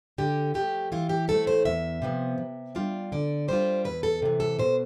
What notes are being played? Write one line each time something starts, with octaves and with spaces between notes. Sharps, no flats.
D3 G4
F3 A3 G4
E3 F4
G4
A3 C4 E4 A4
C5
E2 E5
C3 F3 B3
C3
G3 D4 F4
D3 D5
G3 D4 F4 C5
E2 B4
A4
C3 E3
A4
B2 C5